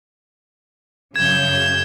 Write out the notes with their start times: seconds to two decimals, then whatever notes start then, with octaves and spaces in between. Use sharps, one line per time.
1.16 F#2 C#3 G6 G#6 E7